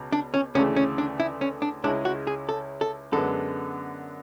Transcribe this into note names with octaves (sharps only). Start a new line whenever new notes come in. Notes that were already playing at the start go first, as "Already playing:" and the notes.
Already playing: C#2 B2
D4
C#4
D2 C#3 E3 A3 C#4
C#4
D4
E4
C#4
D4
C#2 C#3 G#3 C#4 D4 E4
F#4
G#4
A4
A4
F#2 D3 G#3 B3 A4